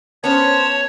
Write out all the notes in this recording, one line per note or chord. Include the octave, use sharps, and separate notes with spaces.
B3 C#4 C5 C#5 A5